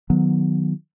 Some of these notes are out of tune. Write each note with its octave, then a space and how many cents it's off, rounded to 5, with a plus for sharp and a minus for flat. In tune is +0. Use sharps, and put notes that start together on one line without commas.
D#3 -15 F#3 -20 B3 +0